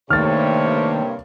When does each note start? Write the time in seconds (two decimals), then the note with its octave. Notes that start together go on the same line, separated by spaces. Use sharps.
0.10 G2 C3 D#3 A3 A#3 C#5 F6 A6